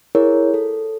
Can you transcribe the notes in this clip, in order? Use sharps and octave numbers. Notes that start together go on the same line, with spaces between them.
E4 G#4 A#4 C#5
A4